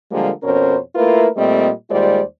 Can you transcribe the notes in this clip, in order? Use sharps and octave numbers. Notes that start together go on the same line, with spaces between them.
D3 F3 G3 G#3 A#3
F2 B2 C#4 A#4 C5 C#5
A3 A#3 E4 F4 A#4 B4
A#2 G3 A3 C4 D#5
D#2 G3 G#3 F4 C5 D5